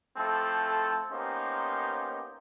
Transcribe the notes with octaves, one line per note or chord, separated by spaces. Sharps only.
F3 A3 C4 E4 A4
A#3 B3 C#4 D#4 G4 C5